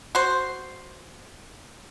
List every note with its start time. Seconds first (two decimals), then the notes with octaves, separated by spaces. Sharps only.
0.15 F#4 C5